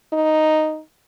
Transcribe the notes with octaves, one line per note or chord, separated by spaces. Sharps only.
D#4